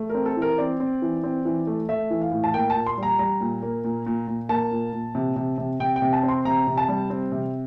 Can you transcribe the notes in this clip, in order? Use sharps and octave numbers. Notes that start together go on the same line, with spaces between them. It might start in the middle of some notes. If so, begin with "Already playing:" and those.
Already playing: A3
C4 A#4
A4
E3
A#4
C4 D5
C4
E3
C4
E3
A3
A3 E5
E3
F5
A2
A5
A#3 G5
A5
A#2
C6
G3 A#5
G3 A#5
A#2
A#3
A#2
A#2
A#2
A#3 A5
A#2
A#2
C3
C3
C3
C3 G5
G5
C3
A5
C4
C6
C3 A#5
C3
A5
G3
C4
C3